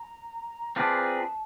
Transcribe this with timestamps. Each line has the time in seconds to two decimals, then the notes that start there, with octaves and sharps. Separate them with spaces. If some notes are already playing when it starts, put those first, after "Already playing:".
Already playing: A#5
0.76 C4 F4 G#4 B4 D5 A5
0.93 A5
0.97 A#5
1.18 A5